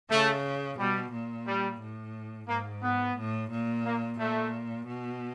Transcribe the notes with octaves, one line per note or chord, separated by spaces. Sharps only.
C#3 A3
B2 G3
A#2
G3
A2
G#2 A#3
B3
A2
A#2
A#3
A#2 A3
B2